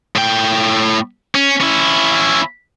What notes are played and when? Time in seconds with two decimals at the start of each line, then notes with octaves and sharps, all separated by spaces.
0.16 A2 G5
1.35 C#4
1.61 C#4 E4